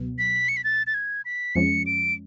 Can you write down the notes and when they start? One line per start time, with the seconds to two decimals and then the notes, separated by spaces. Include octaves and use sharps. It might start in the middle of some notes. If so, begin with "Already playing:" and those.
Already playing: C#2 B2 F#3 B3
0.18 B6
0.49 C#7
0.57 B6
0.64 A6
0.87 A6
0.94 G#6
1.25 B6
1.55 F2 F3 G#3 C#4 C#7
1.86 D7